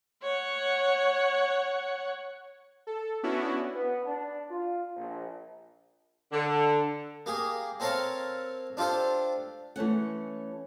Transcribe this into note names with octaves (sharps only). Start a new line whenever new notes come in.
C#5 F#5
A4
B3 C#4 D4 E4 F#4
B3
D4
F4
A#1
D3
A#3 G4 G#4
C4 A4 A#4 C#5 F5 A5
D4 F4 G4 A4 C5
E3 A3 C#4 F#5